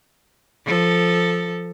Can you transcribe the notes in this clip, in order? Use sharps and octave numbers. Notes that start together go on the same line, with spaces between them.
F3 A4